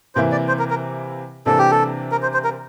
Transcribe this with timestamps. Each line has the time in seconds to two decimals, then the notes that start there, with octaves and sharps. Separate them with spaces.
0.15 C3 E3 A#3 E4 C5
0.32 D5
0.48 C5
0.59 A#4
0.70 A#4
1.46 C3 E3 A#3 D4 A4
1.59 G4
1.71 A4
2.12 A#4
2.23 C5
2.34 C5
2.44 A#4